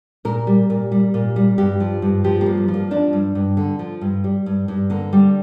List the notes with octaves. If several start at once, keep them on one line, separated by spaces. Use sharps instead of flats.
A#2 A#4
G3
A#2
G3
A#2
G3
G2 G4
F3
G2
F3 G4
A#3
G2
G3
F3
A#3
F3 D4
G2
G2
D3
F3
G2
G3
G2
G2
D3 A#3
G3